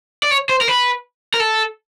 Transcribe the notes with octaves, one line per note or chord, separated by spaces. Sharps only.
D5
C#5
C5
A#4
B4
A#4
A4